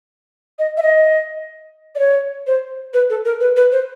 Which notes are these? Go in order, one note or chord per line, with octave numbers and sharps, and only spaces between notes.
D#5
E5
D#5
D5
C#5
C5
B4
A4
A#4
B4
B4
C5